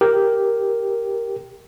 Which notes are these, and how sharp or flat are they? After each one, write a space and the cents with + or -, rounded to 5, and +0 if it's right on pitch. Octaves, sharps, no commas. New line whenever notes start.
G4 +0 A#4 +0